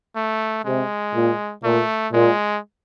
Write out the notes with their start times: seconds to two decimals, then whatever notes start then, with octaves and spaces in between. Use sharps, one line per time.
0.16 A3
0.65 C3 G#3
1.14 A#2
1.64 A#2 A3
2.13 A#2 G#3